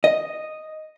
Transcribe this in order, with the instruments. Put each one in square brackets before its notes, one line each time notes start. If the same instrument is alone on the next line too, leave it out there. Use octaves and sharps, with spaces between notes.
[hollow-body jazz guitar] D#5